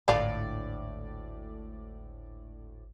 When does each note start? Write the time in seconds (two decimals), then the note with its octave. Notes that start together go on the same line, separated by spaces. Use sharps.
0.08 G#1 D2 A2 D4 F4 D5